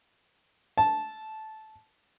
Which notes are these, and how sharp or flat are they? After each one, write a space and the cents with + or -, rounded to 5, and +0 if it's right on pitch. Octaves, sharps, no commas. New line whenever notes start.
A5 -15